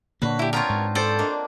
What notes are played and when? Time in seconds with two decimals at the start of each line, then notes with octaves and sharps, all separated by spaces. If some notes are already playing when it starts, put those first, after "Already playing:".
0.22 A#2 D3 F#3 A#3 D4 F#4 B4
0.39 E4 G4
0.53 B3 C4 F4 A#4 C#5 A5 D6
0.69 G#2
0.95 A4 C5 D5
1.19 A#3 D4 D5 D#5